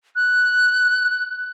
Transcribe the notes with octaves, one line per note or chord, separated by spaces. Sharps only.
F#6